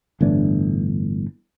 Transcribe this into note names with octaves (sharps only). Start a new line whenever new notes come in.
G1 A2 E3 D4